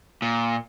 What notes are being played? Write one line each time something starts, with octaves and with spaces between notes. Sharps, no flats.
A#2